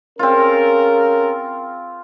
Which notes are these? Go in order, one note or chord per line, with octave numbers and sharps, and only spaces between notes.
C4 C#4 F4 G#4 A#4